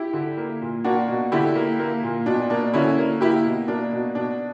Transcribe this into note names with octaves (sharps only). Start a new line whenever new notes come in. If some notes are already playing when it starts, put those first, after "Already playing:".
Already playing: E4 G4
D3
A#3
A#2
A#3 D4 F#4
B2
D3 E4 G4
A#3
A#3
A#2
B2 D4
A#3 D4
D3 C#4 E4
A#3
A#3 E4 G4
B2
A#3 D4
B2
B2 D4